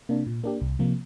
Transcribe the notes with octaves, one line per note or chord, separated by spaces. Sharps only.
C3 A#3 D4
A#2
A#3 D4 G4
C2
C3 F3 A#3